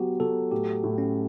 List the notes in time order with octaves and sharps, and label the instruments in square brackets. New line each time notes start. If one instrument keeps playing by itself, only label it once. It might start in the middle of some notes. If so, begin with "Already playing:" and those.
Already playing: [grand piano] F#3 B3 [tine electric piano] F#4 G4
[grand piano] F#3 [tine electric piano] A4
[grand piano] A2 [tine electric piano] G4
[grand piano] A2
[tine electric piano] C#4